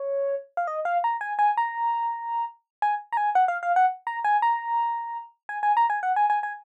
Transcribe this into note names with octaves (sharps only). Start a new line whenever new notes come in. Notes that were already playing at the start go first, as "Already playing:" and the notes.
Already playing: C#5
F5
D#5
F5
A#5
G#5
G#5
A#5
G#5
A#5
G#5
F#5
F5
F5
F#5
A#5
G#5
A#5
G#5
G#5
A#5
G#5
F#5
G#5
G#5
G#5